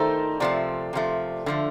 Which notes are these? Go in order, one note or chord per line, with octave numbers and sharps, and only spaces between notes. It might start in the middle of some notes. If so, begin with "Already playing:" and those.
Already playing: D#3 A3 D#4 A4 A#4 C5 D5
C3 F3 A3 D5
C3 F3 A3
D3 F3 A3